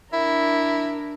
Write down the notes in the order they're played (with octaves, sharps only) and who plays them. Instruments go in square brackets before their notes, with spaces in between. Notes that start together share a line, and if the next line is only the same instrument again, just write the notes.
[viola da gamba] D4 A#4 [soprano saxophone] E4